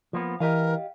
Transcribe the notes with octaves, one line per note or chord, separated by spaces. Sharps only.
F3 A#3 B3
E3 G4 A#4 D#5 F5